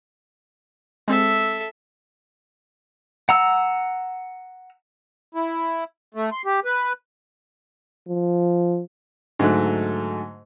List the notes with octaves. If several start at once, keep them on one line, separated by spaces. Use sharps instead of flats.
G#3 C4 A4 E5
F#5 A#5 E6
E4
A3
C6
G4
B4
F3
G#2 D3 F#3 A3 D#4 F#6